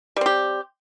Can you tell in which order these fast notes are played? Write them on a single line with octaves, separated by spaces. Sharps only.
G3 C4 G4